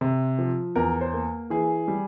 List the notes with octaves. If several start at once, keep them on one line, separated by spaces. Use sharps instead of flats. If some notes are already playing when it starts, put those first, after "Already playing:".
C3
F3
E2 A#4
C5
A#3
E3 G#4
G3